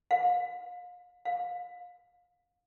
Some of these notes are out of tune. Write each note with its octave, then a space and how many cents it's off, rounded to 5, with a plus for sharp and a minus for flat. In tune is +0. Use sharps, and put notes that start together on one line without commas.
F5 +35
F5 +25